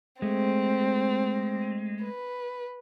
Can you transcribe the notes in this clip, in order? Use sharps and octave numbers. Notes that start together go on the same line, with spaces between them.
G#3 A3 C4
B4